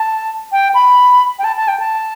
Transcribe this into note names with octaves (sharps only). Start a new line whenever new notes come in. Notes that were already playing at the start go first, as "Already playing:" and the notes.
Already playing: A5
G5
B5
G5
A5
A5
G5
A5